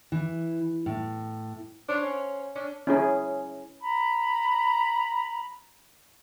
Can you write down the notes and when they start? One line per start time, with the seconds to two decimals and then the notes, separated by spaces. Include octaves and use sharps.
0.12 E3
0.86 A2
1.89 D4 C5 C#5 F5
2.03 C#4
2.55 C#4 D4
2.87 C#4 E4 G#4
3.81 A#5 B5